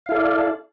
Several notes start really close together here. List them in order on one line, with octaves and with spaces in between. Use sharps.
F5 E4 A4 D5